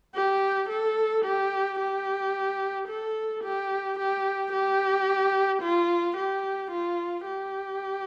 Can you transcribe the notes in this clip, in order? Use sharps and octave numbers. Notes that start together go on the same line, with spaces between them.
G4
A4
G4
G4
A4
G4
G4
G4
F4
G4
F4
G4